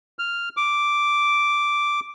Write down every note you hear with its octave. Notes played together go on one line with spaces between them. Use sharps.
F6
D6